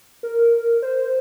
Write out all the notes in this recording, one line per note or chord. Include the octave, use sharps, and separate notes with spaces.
A#4
C5